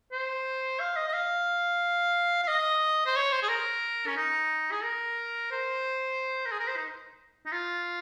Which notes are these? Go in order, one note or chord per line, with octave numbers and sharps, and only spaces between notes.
C5
F5
D#5
D#5
F5
F5
D#5
C5
C#5
C5
G#4
A#4
C#4
D#4
G#4
A#4
C5
A#4
G#4
A#4
C5
D#4
D#4
F4